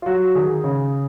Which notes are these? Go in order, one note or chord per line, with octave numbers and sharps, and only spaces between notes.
F4
F#3 F#4
D#3 G#4
C#3